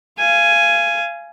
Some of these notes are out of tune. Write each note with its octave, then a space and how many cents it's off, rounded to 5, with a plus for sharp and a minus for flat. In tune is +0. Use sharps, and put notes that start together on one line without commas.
F5 -25 G#5 +5